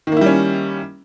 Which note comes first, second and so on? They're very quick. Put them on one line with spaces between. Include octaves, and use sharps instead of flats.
D#3 A#3 E4 G3 C#4